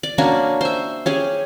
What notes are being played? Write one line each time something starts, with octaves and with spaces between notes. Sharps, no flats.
D5
A#3 C#4 D4 F#4
C5 E5
C#4 G4 G#4